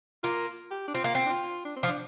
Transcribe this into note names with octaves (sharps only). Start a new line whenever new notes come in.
A#3 F4
G4
D4
C4 F4
A#3
C4
D4
F4
D4
C4
F3
D4